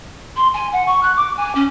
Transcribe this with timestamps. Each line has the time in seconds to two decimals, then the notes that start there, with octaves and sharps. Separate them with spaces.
0.36 C6
0.53 G#5
0.72 F#5
0.86 C#6
1.02 F#6
1.16 D6
1.37 G#5
1.55 C#4